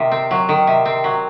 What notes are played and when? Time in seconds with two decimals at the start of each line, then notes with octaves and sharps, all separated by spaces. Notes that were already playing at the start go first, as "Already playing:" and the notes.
Already playing: C3 D#3
0.11 C4
0.31 F#3
0.49 D#3
0.67 C3
0.86 C4
1.04 F#3